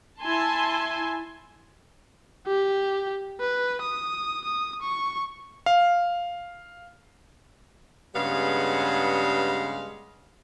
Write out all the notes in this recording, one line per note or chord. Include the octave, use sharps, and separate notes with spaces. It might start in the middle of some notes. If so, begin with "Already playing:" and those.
E4 G#5 A5 C6
G4
B4
D#6
D#6
C#6
F5
G2 C#3 G3 G#3 B3 F5